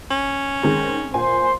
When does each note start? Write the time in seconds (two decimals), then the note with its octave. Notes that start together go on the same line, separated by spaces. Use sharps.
0.11 C#4
0.63 D#3 G#3 C4
1.14 A#2 C5 G#5 C6